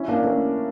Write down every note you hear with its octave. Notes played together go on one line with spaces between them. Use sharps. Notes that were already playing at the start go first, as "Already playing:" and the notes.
Already playing: C#4 E4
A#3 D4
A3 C#4